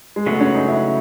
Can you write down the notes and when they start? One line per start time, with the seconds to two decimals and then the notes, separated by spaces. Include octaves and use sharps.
0.16 G#3
0.26 C#3 F#3 A3 B3
0.40 C#4
0.55 D#4
0.68 E4